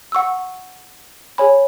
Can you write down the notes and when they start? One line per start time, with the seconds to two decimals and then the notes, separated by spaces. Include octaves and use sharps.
0.12 F#5 C#6 E6
1.38 G#4 C#5 G#5 B5